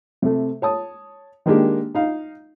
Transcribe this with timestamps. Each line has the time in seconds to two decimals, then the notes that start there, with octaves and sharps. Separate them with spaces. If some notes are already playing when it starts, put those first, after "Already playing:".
0.22 C3 A3
0.62 C#5 A5 D#6
1.46 D#3 G#3 A#3 D4 G4
1.95 D#4 F5